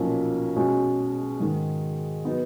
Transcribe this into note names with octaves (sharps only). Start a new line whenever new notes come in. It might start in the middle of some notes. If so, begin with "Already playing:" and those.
Already playing: B1 A#2 F3 A#3 C#4
B2 G#3 C#4
G#2 D#3 G#3
F#3 B3 D#4